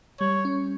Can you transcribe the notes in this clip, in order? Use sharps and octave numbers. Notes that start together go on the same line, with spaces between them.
G3 C#5
C#4